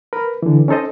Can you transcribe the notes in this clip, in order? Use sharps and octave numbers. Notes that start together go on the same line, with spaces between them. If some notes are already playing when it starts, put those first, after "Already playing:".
A#4 B4 B5
D3 E3
C#4 D#4 A4 C5 D#5